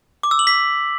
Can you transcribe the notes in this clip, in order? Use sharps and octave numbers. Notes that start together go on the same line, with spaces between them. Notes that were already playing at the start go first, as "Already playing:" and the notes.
D6
E6
F#7
B6